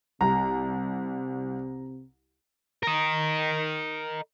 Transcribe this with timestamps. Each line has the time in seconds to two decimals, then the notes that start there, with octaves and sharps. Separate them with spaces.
0.21 C2 C3 A#5
2.83 A#4 D#5